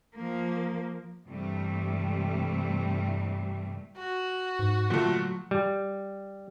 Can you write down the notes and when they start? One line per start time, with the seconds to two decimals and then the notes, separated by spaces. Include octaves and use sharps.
0.15 F3 A#3
1.27 G2 C3 E3 G3 A3
3.98 F#4
4.59 G#2
4.90 A#2 D3 F#3 A3
5.51 G3